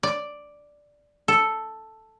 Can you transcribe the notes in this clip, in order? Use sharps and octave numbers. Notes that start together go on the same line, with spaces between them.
D5
A4